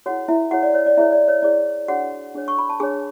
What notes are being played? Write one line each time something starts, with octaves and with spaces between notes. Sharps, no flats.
E4 F#4 G#4 C#5 F#5
E4 E5
E4 F#4 G#4 C#5 F#5
D5
C#5
D5
E4 G#4 C#5 E5
D5
C#5
E4 G#4 C#5 D5
D4 F#4 G#4 C#5 F#5
D4 G#4 C#5
C#6
B5
A5
D4 G#4 C#5 G#5